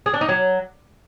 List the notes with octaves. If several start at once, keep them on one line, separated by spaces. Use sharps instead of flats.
G#4
D4
D#4
F#3